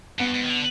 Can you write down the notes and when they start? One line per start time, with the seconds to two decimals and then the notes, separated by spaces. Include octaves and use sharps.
0.19 G2 B3
0.34 G#2
0.43 D#3
0.50 D3